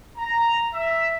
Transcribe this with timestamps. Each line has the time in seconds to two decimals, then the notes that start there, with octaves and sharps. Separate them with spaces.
0.18 A#5
0.74 E5